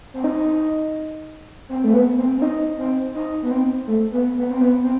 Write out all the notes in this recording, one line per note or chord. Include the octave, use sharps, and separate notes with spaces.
C4
D#4
C4
A3
B3
C4
C4
D#4
C4
D#4
B3
C4
A3
B3
B3
C4
B3
C4